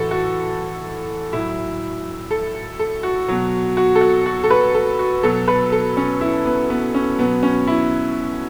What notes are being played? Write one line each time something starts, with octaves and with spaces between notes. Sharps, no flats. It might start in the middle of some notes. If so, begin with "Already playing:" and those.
Already playing: A2 E3 F#4 A4
F#4
A2 F#3 E4
A4
A4
F#4
B2 F#3
F#4
A4
F#4
F#4
A4
B4
A4
F#4
B2 F#3 A4
B4
A4
C#4
E4
B3
B3
C#4
B2 F#3 B3
C#4
E4